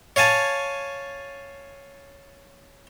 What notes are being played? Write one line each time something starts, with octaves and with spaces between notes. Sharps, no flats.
C#5 F5 G#5 A5